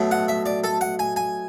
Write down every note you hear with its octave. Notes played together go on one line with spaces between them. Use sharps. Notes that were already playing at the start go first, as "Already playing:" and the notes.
Already playing: B2 F#3 A3
F#5
E5
D5
A4
F#5
G#5
G#5